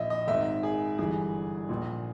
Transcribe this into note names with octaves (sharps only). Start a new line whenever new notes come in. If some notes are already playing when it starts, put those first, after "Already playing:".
Already playing: A#1 A#2 D#5 E5
D#5
G#1 G#2 D#3 E5
G#4
G1 G2 E3 G#4
A#1 A#2